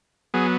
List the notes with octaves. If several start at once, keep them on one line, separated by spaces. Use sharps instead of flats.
F#3 B3 G#4